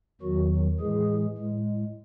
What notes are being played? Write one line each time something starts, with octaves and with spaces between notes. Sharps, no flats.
E2 D#3 F#3 F#4
A2 E3 G#3 G#4
A2 G#3